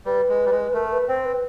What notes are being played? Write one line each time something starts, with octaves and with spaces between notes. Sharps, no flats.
G3 B4
G#3
G3
G#3
A3 A#4
B4
C4 C5
B4